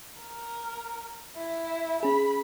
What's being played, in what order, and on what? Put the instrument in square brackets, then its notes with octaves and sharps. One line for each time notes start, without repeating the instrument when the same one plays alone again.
[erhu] A#4
E4
[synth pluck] C#4 G#4 [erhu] B5